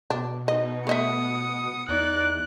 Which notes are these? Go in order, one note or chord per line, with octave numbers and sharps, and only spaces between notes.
B2 D4
D#4 D#5
A3 B3 D#5 E5 D#6 C#7
E2 D#4 D5 F#6